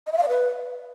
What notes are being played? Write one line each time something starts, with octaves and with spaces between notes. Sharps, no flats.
D#5
E5
F5
D5
B4